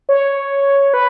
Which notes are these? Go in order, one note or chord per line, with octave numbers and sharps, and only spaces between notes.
C#5
B4